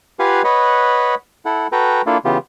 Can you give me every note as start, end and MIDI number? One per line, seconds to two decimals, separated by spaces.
0.19 0.42 65
0.19 0.42 67
0.19 0.42 71
0.19 0.42 77
0.19 0.42 78
0.19 0.42 80
0.44 1.15 71
0.44 1.15 73
0.44 1.15 75
0.44 1.15 78
0.44 1.15 83
1.45 1.67 64
1.45 1.67 69
1.45 1.67 78
1.72 2.02 66
1.72 2.02 69
1.72 2.02 71
1.72 2.02 79
1.72 2.02 82
2.06 2.18 58
2.06 2.18 62
2.06 2.18 64
2.06 2.18 65
2.06 2.18 69
2.25 2.38 49
2.25 2.38 52
2.25 2.38 59
2.25 2.38 65
2.25 2.38 67